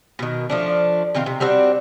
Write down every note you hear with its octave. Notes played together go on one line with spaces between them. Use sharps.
B2 D#3
F3 A3 D4
B2 D#3 C4 F4
C3
G3 C4 D4 F#4